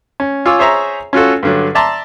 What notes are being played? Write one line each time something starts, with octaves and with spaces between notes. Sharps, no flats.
C#4
F4 C#5 G#5 D6 E6
G#4 C5 C#5 E5 A#5
C#4 F4 F#4 A4
G2 D3 F#3
D5 E5 A5 A#5 C6